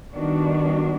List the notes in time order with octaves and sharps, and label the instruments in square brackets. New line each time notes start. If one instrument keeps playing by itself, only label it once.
[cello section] D#3 G3 B3 D4 F#4